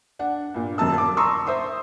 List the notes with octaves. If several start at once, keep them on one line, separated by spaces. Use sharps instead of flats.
D4 F#5
G2 A#2
D#1 F#2 A#3 A5 E6
A5 D6
A5 A#5 C6 C#6 D#6 E6
C5 E5 C6 D#6